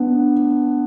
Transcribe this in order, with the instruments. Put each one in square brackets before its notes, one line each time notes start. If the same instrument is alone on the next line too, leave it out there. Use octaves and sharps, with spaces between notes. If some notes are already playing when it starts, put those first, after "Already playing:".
Already playing: [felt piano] B3 D4